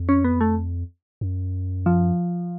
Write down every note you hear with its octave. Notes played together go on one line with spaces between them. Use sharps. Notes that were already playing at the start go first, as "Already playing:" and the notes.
Already playing: F2
C#4
B3
A3
F#2
F3